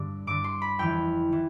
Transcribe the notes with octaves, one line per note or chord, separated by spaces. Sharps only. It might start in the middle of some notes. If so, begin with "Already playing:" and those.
Already playing: G2 D3 D6
G2 D3 D6
C6
B5
F2 E3 G5
E3